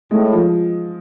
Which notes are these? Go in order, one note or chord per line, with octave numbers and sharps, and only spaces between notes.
A2 G#3
F3